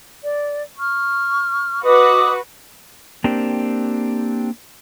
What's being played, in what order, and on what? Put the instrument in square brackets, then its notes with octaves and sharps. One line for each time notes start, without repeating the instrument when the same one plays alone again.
[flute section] D5
C#6 F6
[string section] F#4 B4 [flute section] D#5 D6 D#6
[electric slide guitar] A#3 C4 D4 G4